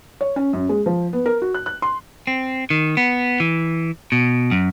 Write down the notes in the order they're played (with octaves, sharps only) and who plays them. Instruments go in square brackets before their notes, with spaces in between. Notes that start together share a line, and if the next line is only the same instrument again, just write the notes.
[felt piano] C#5
C#4
F#2
G#3
F3
B3
A#4
F#4
F#6
F#6
C6
[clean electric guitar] C4
D#3
B3
E3
B2
F#2